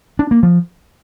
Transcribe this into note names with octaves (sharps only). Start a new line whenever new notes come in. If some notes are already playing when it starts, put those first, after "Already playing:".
D4
A#3
F3